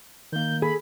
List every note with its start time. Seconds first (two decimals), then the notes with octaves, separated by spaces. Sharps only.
0.32 D#3 A#3 G6
0.62 G#4 A4 B5